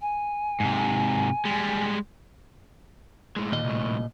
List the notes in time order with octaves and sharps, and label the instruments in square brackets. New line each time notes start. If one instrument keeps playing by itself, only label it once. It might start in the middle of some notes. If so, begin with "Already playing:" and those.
[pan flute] G#5
[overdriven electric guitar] G#2 C3
G3 G#3
A2 G#3
[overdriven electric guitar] D#2 [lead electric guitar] A#2 D#5
[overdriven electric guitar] C2 A2